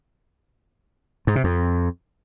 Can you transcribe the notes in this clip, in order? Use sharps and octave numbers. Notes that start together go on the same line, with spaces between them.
G#2
C3
F2